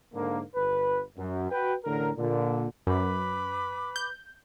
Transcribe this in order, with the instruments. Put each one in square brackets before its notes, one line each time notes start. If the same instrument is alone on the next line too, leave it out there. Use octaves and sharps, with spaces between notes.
[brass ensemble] G#2 D3 A#3
G1 B4
F#2
F#4 B4 G5
A1 A2 D3 A#4
A#2 D3
[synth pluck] F#2 [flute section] B4 B5 D6
[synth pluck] G6